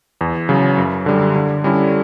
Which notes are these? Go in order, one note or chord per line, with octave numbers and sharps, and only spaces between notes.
E2
C#3 F#3
F#2
D3 G3
D3
G3 C#4 E4